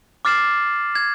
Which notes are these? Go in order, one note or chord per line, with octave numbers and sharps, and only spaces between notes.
D6 F6 A6 C7 E7 F#7
G#6